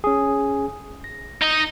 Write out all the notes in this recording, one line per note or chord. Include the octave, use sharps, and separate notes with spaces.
C#4 G#4
A#6
D#4 D#5